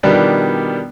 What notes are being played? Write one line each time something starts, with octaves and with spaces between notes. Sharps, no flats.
B2 D#3 F3 G3 B3 D4